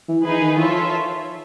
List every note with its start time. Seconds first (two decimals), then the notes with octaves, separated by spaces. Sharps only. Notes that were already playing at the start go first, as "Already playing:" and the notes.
0.09 E3
0.25 E3 D#4 G#4 B4
0.41 D#3
0.57 E3 F4 A4 C#5 E5
0.68 F3